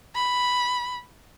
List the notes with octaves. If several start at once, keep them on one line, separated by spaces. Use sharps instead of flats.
B5